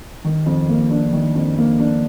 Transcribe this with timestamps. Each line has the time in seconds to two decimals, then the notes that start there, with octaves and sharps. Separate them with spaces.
0.24 D#3
0.46 F2
0.69 A#3
0.90 D4
1.13 D#3
1.35 F2
1.58 A#3
1.79 D4